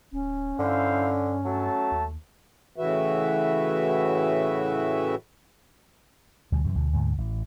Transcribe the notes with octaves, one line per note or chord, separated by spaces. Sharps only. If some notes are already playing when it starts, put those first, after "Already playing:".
D1 C#4
G2 D3 E4 C5 F5
F#3 A3 A5
D#2
A2 C#3 E3 F#4 B4 E5
D2 B2 G3
F#2 C3 E3
D2 B2
D2 G#2 D3
A1